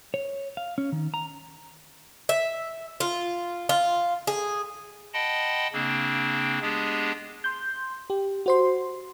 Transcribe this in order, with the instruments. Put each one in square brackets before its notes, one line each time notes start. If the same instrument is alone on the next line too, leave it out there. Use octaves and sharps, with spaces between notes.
[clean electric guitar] C#5
F5
C#4
D#3
A#5
[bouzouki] E5
F4
F4
G#4
[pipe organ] D#5 F#5 G5 A5 B5 C6
C#3 A#3 C4 D4
G#3 B3 D4 G4 G#4
[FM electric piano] C6 G6
G4
F#4 C5 C6